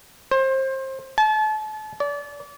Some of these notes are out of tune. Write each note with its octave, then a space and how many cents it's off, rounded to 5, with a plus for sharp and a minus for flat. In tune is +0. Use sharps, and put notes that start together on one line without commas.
C5 +25
A5 -35
D5 -30